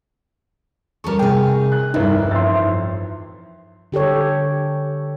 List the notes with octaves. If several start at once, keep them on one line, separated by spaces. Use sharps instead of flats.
G3 C#4 A4 A#4 C#6
C3 D#4 G#4 G5
F#6
F1 C2 G2 D#3 D#4
A1 F2 E5 C6 A6
D3 G4 A4 C#5